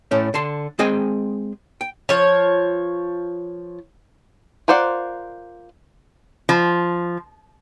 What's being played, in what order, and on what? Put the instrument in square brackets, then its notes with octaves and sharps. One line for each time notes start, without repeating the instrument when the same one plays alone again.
[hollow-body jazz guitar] A2 A3 C#4
D3 A5 C6
G#3 C4 G#4 D#5 G5 G#5
G5
[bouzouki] F3 C#5
[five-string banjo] F4 A#4 C5 D5 F#5
[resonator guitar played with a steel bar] F3